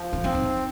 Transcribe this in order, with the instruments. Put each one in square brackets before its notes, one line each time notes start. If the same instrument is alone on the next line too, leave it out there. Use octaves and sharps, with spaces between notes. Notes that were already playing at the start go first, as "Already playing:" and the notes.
Already playing: [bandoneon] F3
[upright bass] C#4
[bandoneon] C4 [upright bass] C#4
[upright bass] D#4